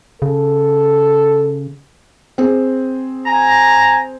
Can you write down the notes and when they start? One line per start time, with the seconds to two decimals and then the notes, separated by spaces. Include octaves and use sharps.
0.22 C#3 A4
2.38 C4 G#4
3.25 G#5 A#5